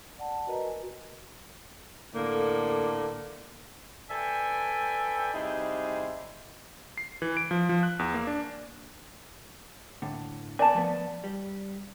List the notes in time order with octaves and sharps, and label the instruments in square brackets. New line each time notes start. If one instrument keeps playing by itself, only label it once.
[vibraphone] D5 F#5 A5
F#4 A#4 B4 D#5 A#5
F#4 A#4 G#5
[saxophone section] A2 D3 A#3
[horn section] A4 B4 D5 E5 G5 G#5
C3 G3 D#4 E4 G#4 C5
[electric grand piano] C7
E3
D7
F3
F3
F#6
E2
A#3
D4
[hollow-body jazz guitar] A2 D3
[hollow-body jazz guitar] B3 G#5 [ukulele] D5 A5
[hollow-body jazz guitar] F3 A3 B3
G3